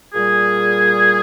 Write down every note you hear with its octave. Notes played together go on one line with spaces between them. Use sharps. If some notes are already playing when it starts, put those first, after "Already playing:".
A#2 G3 G#4